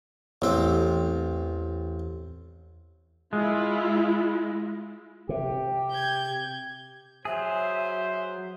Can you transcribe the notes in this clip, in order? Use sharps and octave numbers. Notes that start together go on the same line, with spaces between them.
A1 E2 C4
G#3 E4 F4
C3 G4
G6 G#6
F#3 G#4 C5 E5